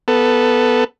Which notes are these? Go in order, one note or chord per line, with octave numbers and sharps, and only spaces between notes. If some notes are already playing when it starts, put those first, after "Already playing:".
B3 A4